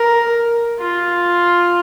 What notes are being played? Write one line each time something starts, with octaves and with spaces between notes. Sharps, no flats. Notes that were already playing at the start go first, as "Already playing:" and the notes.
Already playing: A#4
F4